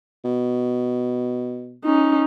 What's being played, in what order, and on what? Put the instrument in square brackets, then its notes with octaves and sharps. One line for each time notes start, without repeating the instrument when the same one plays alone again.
[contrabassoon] B2
[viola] C#4 D#4